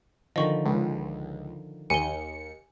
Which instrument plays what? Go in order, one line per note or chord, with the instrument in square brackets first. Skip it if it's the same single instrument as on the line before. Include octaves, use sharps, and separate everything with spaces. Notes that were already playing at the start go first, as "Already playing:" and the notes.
[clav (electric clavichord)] D3 D#3 F3 [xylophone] D#5 C#6
[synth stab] C#2
[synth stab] D#2 C#7 [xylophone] G#5 G7